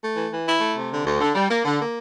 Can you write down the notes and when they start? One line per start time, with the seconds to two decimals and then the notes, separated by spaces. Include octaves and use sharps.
0.02 A3
0.16 E3
0.31 E3
0.46 E4
0.61 A3
0.75 C3
0.91 D3
1.05 D2
1.20 D3
1.35 G3
1.49 A#3
1.65 D3
1.79 A#3